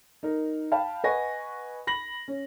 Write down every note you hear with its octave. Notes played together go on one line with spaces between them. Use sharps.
D#4 A#4
F5 G5 A5 B5
B4 D#5 F#5 G#5 C#6 A#6
B5 A#6 F#7
C#4